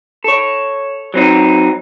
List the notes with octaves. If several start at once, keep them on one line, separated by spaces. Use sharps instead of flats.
A4 C#5
F#3 C4 D#4